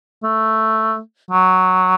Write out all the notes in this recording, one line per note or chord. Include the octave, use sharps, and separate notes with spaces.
A3
F#3